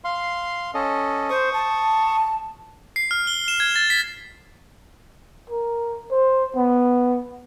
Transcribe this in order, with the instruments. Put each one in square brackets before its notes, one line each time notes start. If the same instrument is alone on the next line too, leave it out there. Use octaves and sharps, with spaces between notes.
[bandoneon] F5 C6
C#4 A4 D#5
[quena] C5 [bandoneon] C#6 D#6
[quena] A5
[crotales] C7
F6
G7
E7
G#6
A6
B6
[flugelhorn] A#4
C5
B3